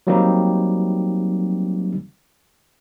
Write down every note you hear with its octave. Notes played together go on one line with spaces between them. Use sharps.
F#3 G3 A#3 C4 D#4 G4